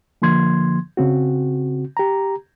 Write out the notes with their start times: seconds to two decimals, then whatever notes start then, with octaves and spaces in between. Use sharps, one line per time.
0.22 D3 F3 A#3 C6 G#6
0.97 C#3 C4 F#4
1.97 G4 A#5